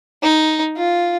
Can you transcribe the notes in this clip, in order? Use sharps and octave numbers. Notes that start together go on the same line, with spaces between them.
D#4
F4